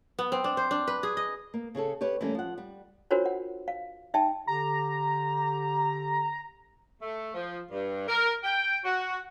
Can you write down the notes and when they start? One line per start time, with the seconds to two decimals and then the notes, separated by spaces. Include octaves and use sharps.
0.19 B3
0.32 C4
0.44 D4
0.57 C5
0.71 D4
0.87 B4
1.03 G#4
1.17 D#5
1.54 A#3
1.75 C#3 C#4 G#4 A4
2.01 G4 B4 C#5
2.21 E3 G3 A3 A#3 C#4
2.35 F3 F#5
2.58 G3
3.11 D4 F4 F#4 A#4 C5 C#5
3.26 F#5
3.68 F5
4.14 D#4 E5 G5 A5
4.47 D3 G4 A#5
7.02 A3
7.34 F3
7.71 G2
8.08 A#4
8.43 G5
8.84 F#4